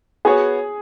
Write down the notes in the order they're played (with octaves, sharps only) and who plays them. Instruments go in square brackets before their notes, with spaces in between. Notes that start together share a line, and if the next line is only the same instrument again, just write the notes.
[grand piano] B3 F#4 C#5 [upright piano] G#4